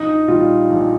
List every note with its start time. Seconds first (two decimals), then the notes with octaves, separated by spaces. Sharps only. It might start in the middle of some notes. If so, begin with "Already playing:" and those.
Already playing: A#1 D#4
0.28 A#2 G3 F4
0.70 A#1